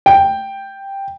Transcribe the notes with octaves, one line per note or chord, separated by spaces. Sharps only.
G5